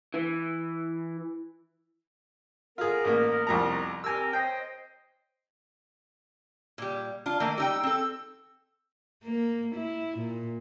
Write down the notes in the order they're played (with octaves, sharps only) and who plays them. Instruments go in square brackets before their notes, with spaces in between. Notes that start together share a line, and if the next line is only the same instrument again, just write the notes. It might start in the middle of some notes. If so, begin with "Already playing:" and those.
[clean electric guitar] E3
[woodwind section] B3 A#4 [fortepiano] F4 G#4
[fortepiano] A1 A#3
C2 F2 A#5
[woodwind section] C4 G4 A#4 [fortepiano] G#5 E6
[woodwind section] C5 C#5 D#5 [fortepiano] G5
[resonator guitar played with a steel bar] A#2 G3
D4 F4
D#3 A3 A#3
[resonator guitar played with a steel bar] G3 D#4 G5 [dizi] E6
[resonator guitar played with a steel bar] C4 A4
[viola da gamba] A#3
E4
A#2